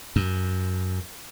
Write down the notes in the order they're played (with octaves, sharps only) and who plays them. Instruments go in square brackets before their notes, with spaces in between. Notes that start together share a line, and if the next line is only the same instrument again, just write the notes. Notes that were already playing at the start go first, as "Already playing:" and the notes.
[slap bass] F#2